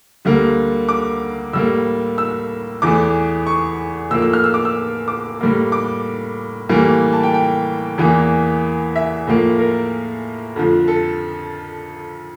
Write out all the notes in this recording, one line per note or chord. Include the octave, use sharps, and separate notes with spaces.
D2 D3 G3 A#3
D6
A2 G3 A#3 E6
E6
E2 E3 A3 D6
C#6
A2 F3 A#3 E6
E6
F6
E6
D6
E6
D6
A2 G3 A#3
D6
A2 E3 G3 A#3
A5
G5
G5
E2 E3 A#3
E5
A2 F3 A#3
A#4
F2 D3 F3
A4